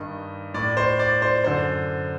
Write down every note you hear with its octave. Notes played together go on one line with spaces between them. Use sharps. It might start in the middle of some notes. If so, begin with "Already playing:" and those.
Already playing: G2 D#3 D#5
A2 D5
C5
D5
C5
F#2 D3 C5